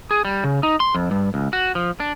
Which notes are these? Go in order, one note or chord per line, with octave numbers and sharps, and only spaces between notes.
G#4
G3
C#3
D#4
C6
F2
G2
C#2
F#4
F3
D4